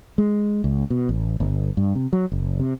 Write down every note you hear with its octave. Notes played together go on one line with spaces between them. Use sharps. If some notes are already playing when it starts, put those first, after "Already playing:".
G#3
C#2
B2
A1
G1
G2
C3
F#3
F#1
C3